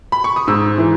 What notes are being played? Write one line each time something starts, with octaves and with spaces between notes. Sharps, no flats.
B5
C#6
D#6
G#2 E6
E3